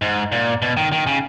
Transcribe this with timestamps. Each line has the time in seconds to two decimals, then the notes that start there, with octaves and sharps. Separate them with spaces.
0.02 G#2
0.32 A#2
0.62 B2
0.77 D#3
0.92 D#3
1.07 C#3